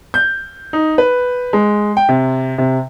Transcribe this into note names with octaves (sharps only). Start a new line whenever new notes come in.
G6
D#4
B4
G#3
G5
C3
C3